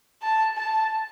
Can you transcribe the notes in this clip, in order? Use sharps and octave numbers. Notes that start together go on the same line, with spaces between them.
A5
A5